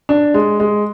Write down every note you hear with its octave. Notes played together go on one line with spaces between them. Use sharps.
D4
G#3
G#3